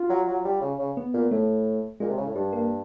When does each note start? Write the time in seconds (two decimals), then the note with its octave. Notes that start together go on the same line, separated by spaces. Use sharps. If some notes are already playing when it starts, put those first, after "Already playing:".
Already playing: F4
0.09 F#3
0.27 F#3
0.45 G3
0.61 C#3
0.79 C#3
0.97 B3
1.14 A#2
1.31 A2 A3
2.00 A#2 G#3
2.09 C3
2.18 C#3
2.26 A2
2.35 G2 G3
2.53 A#3